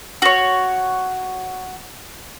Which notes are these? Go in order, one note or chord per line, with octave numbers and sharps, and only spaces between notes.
F#4 C#5